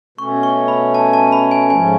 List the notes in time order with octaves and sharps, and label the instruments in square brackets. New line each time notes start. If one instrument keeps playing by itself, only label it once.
[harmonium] B2 A3 C#4 [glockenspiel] C#6
[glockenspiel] C#6
B5
A5
A5
B5
G#5
[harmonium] G#2 F3 A3 C#4 [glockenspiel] G#5